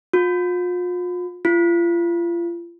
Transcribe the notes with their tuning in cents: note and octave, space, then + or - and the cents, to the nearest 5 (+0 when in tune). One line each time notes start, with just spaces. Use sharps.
F4 +40
F4 -35